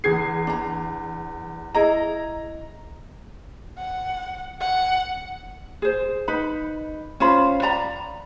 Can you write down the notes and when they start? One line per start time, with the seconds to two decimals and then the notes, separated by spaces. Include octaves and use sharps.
0.04 E2 G#4 G#6 C7
0.47 D4 A#5
1.75 E4 G#4 D#5 A#5
3.78 F#5
4.61 F#5
5.82 G#4 C5
6.28 D#4 B4 B5
7.20 C#4 F4 C5 B5
7.62 D5 A#5 B5